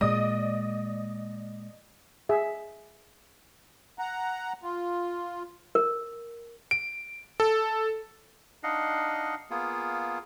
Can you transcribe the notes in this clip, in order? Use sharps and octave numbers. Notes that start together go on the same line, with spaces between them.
A#2 G#3 D5 D#5 D#6
G#4 E5
F#5 A#5
F4
A#4
D7
A4
D4 D#4 D#5 F5 F#5
A#3 B3 F4 G#4